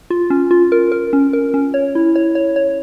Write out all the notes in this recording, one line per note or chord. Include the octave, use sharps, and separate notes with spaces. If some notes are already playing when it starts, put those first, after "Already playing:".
F4
C#4
F4
A#4
A#4
C#4
A#4
C#4
C#5
E4
C#5
C#5
C#5